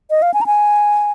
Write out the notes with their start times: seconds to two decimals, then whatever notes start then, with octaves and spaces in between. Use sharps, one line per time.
0.10 D#5
0.22 F5
0.34 G#5
0.41 A#5
0.46 G#5